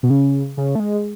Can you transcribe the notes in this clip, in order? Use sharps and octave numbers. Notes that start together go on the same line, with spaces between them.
B2
C#3
C#3
A3
G#3